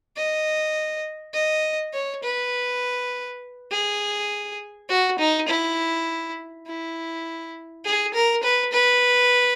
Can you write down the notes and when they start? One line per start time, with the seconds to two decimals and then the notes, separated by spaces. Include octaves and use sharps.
0.16 D#5
1.34 D#5
1.93 C#5
2.23 B4
3.71 G#4
4.89 F#4
5.19 D#4
5.48 E4
6.66 E4
7.85 G#4
8.14 A#4
8.43 B4
8.72 B4